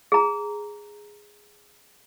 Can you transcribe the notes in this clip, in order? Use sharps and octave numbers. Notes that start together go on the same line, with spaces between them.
G#4 A#5